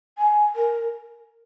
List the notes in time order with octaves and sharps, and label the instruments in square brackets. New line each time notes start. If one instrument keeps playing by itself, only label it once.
[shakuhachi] G#5
A#4